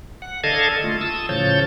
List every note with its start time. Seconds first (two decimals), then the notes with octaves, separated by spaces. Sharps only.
0.22 F#5
0.44 D3 A4 D#5 F5 A5 G#6
0.84 A3 F4
1.01 A5 D#6 E6
1.29 A2 C#3 F3 C#5 G6 A6